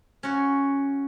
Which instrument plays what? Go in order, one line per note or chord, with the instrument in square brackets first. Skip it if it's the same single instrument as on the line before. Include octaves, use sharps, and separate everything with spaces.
[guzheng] C#4 F#4